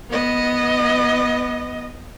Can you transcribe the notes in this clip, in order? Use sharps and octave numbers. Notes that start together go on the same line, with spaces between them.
B3 D#5